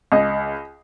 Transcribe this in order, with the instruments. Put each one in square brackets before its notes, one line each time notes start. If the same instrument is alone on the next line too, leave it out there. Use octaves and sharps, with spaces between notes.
[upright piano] C#2 D#5